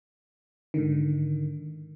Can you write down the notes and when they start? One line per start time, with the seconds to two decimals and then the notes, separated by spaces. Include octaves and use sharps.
0.74 G#2 D3 D#3